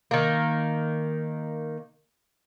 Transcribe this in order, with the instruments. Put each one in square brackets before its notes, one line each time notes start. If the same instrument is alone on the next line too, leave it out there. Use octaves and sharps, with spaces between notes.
[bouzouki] D#3 A#3